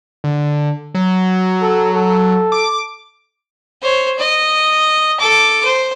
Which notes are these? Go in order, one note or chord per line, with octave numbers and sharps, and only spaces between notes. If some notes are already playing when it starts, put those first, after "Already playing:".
D3
F#3
A4
A4
D6
C5 C#5
D#5
A4 D6
C5